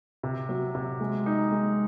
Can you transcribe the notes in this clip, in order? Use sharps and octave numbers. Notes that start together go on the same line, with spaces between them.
C3
F#3
C3
G#3
D#4
G#3